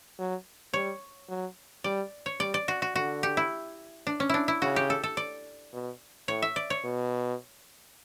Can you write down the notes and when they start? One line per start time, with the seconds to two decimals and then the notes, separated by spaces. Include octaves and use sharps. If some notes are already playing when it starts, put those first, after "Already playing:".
0.18 F#3
0.74 G3 C#5
1.29 F#3
1.84 G3 D5
2.26 C#5
2.40 G3 D5
2.54 D5
2.68 F#4
2.82 F#4
2.95 D3 F#4
3.23 G4
3.37 E4
4.07 D4
4.20 C#4
4.30 D4 E4
4.48 E4
4.62 C#3 F#4
4.76 G4
4.90 A4
5.04 A4
5.17 D5
5.73 B2
6.28 A2 C#5
6.42 E5
6.56 D5
6.70 C#5
6.84 B2